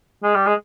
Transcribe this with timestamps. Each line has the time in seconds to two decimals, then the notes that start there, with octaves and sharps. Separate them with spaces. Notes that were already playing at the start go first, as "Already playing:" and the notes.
0.23 G#3
0.35 G3
0.47 G#3